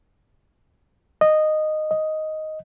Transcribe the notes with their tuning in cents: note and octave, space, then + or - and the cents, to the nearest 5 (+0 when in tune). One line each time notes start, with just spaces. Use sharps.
D#5 -10
D#5 +5